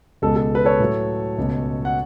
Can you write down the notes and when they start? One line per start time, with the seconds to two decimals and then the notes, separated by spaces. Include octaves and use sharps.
0.22 C#2 B2 G#3 A4
0.36 A4
0.55 B4
0.65 A4 C#5
0.79 A2 F#3 A3
1.38 C#2 B2 A3
1.85 F#5